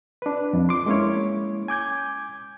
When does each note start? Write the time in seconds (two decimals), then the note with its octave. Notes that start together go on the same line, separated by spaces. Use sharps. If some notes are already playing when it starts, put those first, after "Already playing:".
0.22 D4 B4
0.53 F2
0.69 C6 D6
0.86 G#3 A#3 C#4 E4 C#5
1.68 G#5 D6 G6 G#6